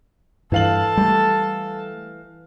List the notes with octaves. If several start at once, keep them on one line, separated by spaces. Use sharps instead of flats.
G2 E3 A4 F5 A5 F#7
G3 A3